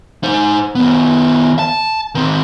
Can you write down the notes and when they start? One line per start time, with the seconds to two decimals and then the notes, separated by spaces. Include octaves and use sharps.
0.24 D#4 C5
0.75 D#3 B3
1.59 A5
2.15 D#3 C4